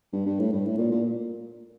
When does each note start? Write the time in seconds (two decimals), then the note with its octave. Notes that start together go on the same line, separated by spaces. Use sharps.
0.13 G2
0.26 G2
0.39 A2
0.52 G2
0.65 A2
0.78 A#2
0.91 A#2